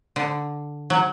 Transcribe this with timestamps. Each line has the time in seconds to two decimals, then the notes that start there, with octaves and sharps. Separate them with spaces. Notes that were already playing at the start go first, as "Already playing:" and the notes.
0.16 D3
0.90 F#3